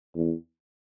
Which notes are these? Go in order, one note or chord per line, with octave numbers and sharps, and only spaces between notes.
E2